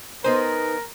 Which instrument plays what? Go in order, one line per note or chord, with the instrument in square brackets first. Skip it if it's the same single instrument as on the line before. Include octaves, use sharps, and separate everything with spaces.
[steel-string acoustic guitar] B3 D#4 G#5 [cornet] A#4 [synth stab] C5